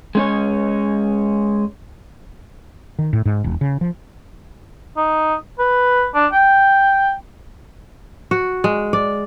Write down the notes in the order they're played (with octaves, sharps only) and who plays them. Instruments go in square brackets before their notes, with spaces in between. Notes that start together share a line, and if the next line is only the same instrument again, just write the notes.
[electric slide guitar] G#3 C#4 C#5
[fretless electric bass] D#3
A2
G#2
E1
C#3
F3
[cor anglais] D#4
B4
D4
G5
[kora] F#4
G#3
D5